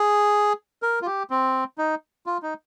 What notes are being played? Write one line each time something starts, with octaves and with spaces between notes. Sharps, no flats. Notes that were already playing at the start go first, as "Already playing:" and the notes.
Already playing: G#4
A#4
F4
G4
C4
D#4
F4
D#4